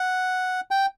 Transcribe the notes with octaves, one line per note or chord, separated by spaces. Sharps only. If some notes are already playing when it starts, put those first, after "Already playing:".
Already playing: F#5
G5